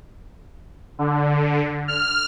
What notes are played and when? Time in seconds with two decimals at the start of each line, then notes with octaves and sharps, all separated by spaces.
0.99 D3
1.88 F6